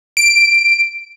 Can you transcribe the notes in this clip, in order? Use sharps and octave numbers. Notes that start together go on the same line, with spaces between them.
D7